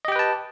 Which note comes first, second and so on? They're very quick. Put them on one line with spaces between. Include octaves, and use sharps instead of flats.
D#5 G4 G5 B4 A5